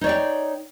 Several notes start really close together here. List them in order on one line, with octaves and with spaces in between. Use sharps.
D#4 C#5 D5 G5